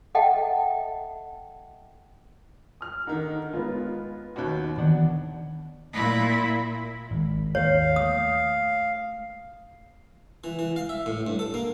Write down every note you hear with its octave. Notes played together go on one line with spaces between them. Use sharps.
A4 D#5 E5 F#5 G5 A5
D#6 F6
D3 D#3 D#4
G#3 B3 F4
D#2 B2
D#3 E3 B3 D4 F#5
A#2 E4
G#1
D#2 C#5 F5
A3 D#6
E3
E3
F5
E5
A2
G2
A4
A#3